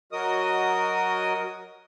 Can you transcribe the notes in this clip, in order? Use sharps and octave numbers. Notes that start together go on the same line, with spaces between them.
F#3 F#4 A#4 D#5 D#6